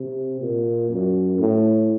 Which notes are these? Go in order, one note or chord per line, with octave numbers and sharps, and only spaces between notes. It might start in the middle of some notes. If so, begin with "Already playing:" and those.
Already playing: C3
A#2
F#2
A2